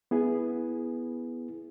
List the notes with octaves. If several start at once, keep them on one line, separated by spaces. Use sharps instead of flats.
B3 E4 G#4